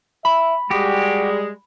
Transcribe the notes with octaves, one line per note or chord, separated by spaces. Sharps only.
E5 B5
G3 G#3 F#4 G4